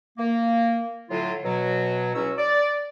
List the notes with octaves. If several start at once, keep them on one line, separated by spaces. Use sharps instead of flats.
A#3
A2 D3 F#3 E4 F4
B2 F#3
C#2 F#3 C#4 E4 F#4 E6
D5